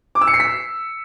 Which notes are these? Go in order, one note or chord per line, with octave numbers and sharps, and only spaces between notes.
D6
E6
C#7
C7
B6